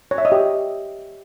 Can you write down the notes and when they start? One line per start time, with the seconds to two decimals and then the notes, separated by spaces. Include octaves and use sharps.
0.11 C#5
0.18 E5
0.25 D#5
0.32 G4